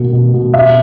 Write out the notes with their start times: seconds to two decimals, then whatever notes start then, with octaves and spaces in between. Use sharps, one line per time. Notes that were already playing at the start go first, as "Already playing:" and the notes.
Already playing: B2 A#3
0.13 B2
0.34 B2
0.54 B2 E5